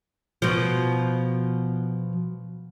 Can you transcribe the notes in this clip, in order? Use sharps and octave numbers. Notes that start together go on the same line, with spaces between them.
B2 F3